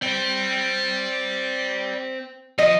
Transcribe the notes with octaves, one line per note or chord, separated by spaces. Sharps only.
C4 D5 G5
F3 D#5